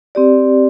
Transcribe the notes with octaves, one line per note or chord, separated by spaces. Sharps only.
C4 G4 D5